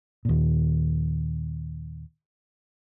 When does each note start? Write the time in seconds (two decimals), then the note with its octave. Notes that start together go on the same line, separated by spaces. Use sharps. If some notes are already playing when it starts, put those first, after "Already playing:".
0.25 D#2 A#2